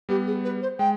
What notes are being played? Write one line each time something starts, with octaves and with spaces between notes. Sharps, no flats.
G3 B3 G4
G#4
B4
C5
G#3 G5